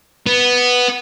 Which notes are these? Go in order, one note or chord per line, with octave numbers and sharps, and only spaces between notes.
B3